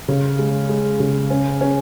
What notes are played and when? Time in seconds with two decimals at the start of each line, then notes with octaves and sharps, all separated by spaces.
0.08 C#3
0.39 G#3
0.69 G#3
1.00 C#3
1.30 C#4
1.61 C#4